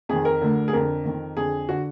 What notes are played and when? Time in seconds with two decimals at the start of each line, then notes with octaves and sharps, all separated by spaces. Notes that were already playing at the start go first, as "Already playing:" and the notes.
0.09 F2 D#3 G#4
0.25 A#4
0.42 D2 D3
0.68 G#4
0.73 F2 D3 A#4
1.05 F2 D#3
1.37 F2 D3 G#4
1.69 D3 F#4